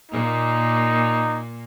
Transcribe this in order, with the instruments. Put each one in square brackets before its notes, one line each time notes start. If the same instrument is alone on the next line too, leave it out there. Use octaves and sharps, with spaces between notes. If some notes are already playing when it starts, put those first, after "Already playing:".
[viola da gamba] A#2 A#3 [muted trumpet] D#4